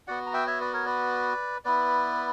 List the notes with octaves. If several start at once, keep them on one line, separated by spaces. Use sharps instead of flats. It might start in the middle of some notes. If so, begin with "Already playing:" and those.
B3 F#4 D5 F#5
A#5
E5 G5
C#5 E5
B4 D5
A#4 C#5
B4 D5
B3 E4 B4 D5